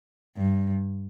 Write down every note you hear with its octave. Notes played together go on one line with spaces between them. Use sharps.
G2